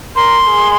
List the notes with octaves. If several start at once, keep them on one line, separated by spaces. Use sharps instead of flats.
A#4 C6
G#4